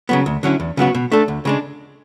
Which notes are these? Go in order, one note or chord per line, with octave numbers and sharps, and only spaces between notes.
C#3 F#3 B3
D2
D3 F#3 C#4 E4
E2
C#3 F#3 B3 F#4
B2
A3 D4 A4
D2
C#3 G#3 D4